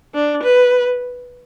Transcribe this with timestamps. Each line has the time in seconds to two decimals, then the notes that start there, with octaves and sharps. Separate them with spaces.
0.14 D4
0.43 B4